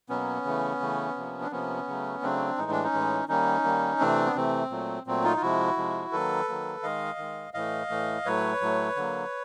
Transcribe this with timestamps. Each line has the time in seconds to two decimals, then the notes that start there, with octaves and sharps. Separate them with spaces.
0.09 B2 F#3 A#3 B3 C#4
0.45 C#3 E3 A3
0.80 C#3 E3 A3
1.16 C3 F3 A#3
1.42 D4
1.51 C3 F3 A#3 B3 C#4
1.88 C#3 F#3 A3
2.22 C#3 F#3 A3 C4 D4
2.58 A2 E3 G#3 D#4
2.71 D4
2.84 C#4 D#4
2.93 A2 E3 G#3
3.28 D#3 G3 A#3 C#4 D#4
3.64 D#3 G3 A#3
4.00 C3 E3 A3 C4 D4
4.26 B3
4.36 C3 E3 A3 C4
4.70 A#2 F#3 A3
5.07 A#2 F#3 A3 C4
5.23 D#4 F4
5.36 F4
5.41 C3 F3 G#3 E4 F#4
5.77 C3 F3 G#3
6.12 D#3 F#3 A#3 A4 B4
6.48 D#3 F#3 A#3
6.83 D#3 G#3 D#5 F5
7.18 D#3 G#3
7.54 A2 E3 A3 D#5 F5
7.90 A2 E3 A3
8.25 A2 F#3 A3 B4 C#5
8.61 A2 F#3 A3
8.96 D3 F#3 A#3